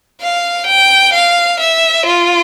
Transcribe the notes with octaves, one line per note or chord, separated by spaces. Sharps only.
F5
G5
F5
E5
F4